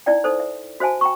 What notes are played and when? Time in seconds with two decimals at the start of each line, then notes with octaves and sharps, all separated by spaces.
0.06 D#4 E4 D5 G5
0.24 D#4 A4 C5
0.40 E5
0.80 F#4 C5 E5 G#5 A5
1.01 G5 A#5 C#6